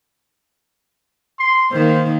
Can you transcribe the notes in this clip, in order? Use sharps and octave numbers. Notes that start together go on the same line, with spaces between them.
C6
D#3 A#3 C5